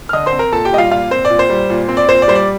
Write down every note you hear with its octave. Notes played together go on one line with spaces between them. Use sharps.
F6
D3 D#5 D#6
C5 C6
C4
A#4 A#5
A#2 A4 A5
G4 G5
G3 D#5
F4 F5
A#2 F4 F5
C4 C5
D5
A#2
C5
G3
A#2
C4
D5
A#2 C5
D5
G3 C5
D5